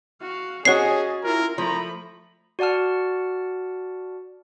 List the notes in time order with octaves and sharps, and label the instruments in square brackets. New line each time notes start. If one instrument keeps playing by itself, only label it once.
[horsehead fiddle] F#4 F5
[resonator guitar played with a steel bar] C#4 F#4 [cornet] G#4 [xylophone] C#5 C7 [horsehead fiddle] D#5 A5
[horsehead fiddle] E4 F4 [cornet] A#4
[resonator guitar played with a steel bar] F3 [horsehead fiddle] A3 B5 [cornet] A#5
[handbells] F#4 D5 F#5 A5 F6